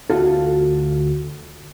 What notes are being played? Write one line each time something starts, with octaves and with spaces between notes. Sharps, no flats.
D2 F4 F#4 A4